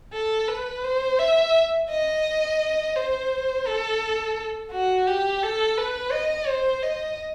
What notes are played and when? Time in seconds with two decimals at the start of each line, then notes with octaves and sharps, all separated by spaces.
0.13 A4
0.48 B4
0.84 C5
1.19 E5
1.90 D#5
2.96 C5
3.66 A4
4.72 F#4
5.07 G4
5.42 A4
5.78 B4
6.12 D#5
6.48 C5
6.83 D#5